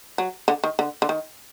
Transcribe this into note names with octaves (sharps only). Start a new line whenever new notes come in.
F#3
D3
D#3
D3
D3
D#3